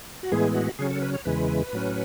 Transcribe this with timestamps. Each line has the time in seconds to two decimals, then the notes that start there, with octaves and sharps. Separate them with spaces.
0.23 F#4
0.32 A2 E3 G#3 B3 G#4
0.55 F#4
0.79 C#3 F#3 C#4 G#4
0.91 A4
1.02 B4
1.14 C#5
1.25 E2 C#3 E3 G#3 B4
1.73 A2 F#3 C#4